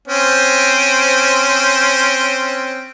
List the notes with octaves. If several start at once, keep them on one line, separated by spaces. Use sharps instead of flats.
C4 C#4 C5